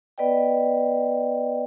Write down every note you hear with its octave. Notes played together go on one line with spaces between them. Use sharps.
B3 B4 D5 D#5 G5